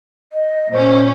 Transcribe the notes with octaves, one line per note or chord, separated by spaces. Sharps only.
D#5
A#2 C#4 C5